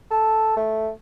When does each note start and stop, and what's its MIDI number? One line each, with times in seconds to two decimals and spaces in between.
0.11 0.53 69
0.57 0.90 57